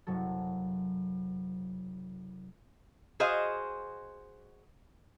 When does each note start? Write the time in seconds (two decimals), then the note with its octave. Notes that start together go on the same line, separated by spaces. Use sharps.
0.07 F#1 C3 F#3 A4
3.20 F#4 G#4 C5 D#5 F5